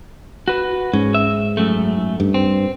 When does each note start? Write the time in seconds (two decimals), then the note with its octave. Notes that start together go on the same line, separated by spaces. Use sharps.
0.48 F#4 B4
0.93 G#2 C#4
1.14 E5
1.57 F#2 A3
2.20 G2
2.34 C4